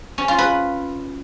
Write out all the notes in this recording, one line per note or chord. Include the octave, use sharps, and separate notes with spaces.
C#4
F4
B4